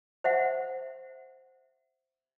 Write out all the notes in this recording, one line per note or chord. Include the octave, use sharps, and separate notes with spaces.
C5 E5 F#5